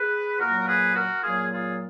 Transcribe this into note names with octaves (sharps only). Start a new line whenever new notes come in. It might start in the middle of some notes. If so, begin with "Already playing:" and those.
Already playing: G#4 B4
A#2 F#3 A#3 F#4 A#4
G#4 B4
F#4 A#4
A#2 F#3 A#3 F4 G#4
F4 G#4